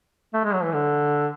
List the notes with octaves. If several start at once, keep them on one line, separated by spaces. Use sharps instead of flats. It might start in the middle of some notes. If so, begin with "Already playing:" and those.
A3
G#3
F#3
E3
D3